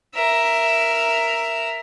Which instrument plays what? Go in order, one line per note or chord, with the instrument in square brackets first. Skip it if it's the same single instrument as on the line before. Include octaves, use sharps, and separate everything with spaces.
[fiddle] A#4 E5